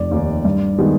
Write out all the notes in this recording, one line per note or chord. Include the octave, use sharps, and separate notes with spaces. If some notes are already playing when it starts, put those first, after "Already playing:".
Already playing: F1 D5
D#2 D#3
G2
D#3 G#3 B3